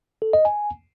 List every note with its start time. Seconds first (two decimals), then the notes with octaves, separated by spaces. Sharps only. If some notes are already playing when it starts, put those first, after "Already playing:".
0.22 A4
0.33 D#5
0.45 G#5